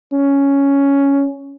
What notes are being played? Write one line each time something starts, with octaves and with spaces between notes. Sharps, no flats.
C#4